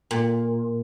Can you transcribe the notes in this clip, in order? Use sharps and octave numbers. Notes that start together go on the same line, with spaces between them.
A#2